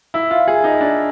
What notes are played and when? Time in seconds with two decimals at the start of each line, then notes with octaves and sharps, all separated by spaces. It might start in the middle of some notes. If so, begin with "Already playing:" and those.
0.14 E4
0.31 F4
0.48 G#4
0.64 D#4
0.81 D4